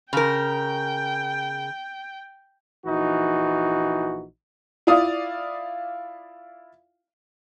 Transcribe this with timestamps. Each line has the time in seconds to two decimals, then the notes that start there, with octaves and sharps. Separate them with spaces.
0.13 C#3 A#4 G5
2.85 A#1 E3 D#4 F#4
4.87 E4 F4 D5 F5 D#6